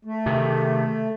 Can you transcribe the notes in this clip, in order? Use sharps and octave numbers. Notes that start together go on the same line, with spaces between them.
A3
C3 D#3